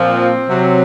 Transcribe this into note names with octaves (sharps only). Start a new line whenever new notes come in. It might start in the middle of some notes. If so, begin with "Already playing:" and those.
Already playing: A#2 F3 C4
C3 F#3